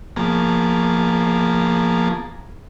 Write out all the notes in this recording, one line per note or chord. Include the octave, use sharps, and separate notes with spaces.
F3 A#3 B3 G#4 A5 A#5